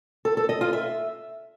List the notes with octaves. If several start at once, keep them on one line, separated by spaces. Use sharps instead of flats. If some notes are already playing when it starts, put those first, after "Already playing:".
A4
A4
D#5
F4
E5